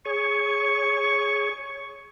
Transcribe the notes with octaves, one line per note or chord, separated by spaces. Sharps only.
G#4 C#5 C#6